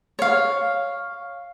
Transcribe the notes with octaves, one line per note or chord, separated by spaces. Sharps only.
C#5 F5